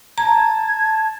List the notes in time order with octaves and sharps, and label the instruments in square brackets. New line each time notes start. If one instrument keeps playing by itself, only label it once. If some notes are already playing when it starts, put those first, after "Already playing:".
[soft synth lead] A5 [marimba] A#5 [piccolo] G#6